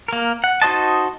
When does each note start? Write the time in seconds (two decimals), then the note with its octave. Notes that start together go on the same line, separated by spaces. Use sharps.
0.08 A#3 A#4
0.44 F#5
0.62 D#4 F#4 C5 D#5 A5